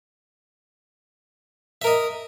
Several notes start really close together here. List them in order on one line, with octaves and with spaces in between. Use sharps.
E5 A#4 D#5